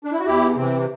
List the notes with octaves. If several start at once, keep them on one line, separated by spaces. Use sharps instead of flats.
D4
E4
F#4
E2 E4 G4
C3 E3 C4